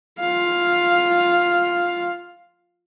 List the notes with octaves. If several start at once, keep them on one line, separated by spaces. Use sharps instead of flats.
F4 F5